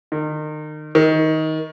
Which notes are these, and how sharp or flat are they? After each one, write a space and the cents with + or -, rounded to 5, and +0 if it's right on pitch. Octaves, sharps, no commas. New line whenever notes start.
D#3 -30
D#3 +20